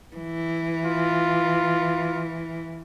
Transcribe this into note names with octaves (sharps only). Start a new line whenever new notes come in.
E3
F4